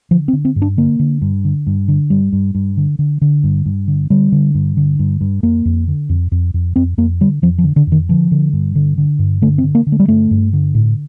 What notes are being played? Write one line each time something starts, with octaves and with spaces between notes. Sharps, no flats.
D3 F3
C4
D3
C4
G2
D4
D3 A#3
D3
G2
D3
G2
D3
G2 G3
G2
G2
D3
D3
D3
G2
G2
D3
D3 G3
D3
G2
D3
G2
G2
F2 A#3
F2
D3
F2
F2
F2
F2 C4
F2 A#3
D3 G3
F2 F3
F3
D3
D3
F2
D#3
D3 F3
D3
G2
D3
D3
G2
D3 A3
C4
D3
A#3
D3
A3
G3
G2 A3
G2
D3
A2